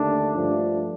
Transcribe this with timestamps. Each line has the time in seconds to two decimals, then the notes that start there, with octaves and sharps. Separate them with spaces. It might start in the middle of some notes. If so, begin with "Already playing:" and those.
Already playing: D#2 D3 A3 D4
0.34 G2 F3 A3 D4